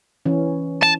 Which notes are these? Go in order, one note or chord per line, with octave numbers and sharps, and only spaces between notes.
E3 C#4
A5